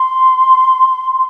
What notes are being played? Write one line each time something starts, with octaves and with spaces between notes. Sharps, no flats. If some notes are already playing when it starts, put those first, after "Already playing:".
Already playing: C6